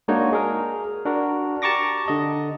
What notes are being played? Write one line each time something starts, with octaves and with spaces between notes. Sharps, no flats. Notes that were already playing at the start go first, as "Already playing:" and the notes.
G#3 A#3 D4 D#4 F#4 C#5
G#4 A#4
D4 F#4 A#4
G4 A5 A#5 C#6 D6 A#6
D3 D#5